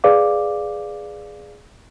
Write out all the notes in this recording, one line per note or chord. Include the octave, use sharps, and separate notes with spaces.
G#4 B4 D5 F5 D6